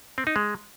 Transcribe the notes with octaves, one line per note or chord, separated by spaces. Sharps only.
C4
D#4
G#3